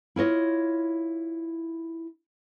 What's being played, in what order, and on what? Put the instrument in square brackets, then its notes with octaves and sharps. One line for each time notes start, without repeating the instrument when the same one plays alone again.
[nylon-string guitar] E4 F4 C#5 D#5